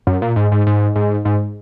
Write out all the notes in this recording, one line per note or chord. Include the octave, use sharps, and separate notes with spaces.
F#2
A#2
G#2
G#2
G#2
G#2
G#2